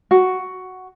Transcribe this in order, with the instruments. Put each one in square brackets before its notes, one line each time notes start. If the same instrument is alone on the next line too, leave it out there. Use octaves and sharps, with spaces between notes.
[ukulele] F#4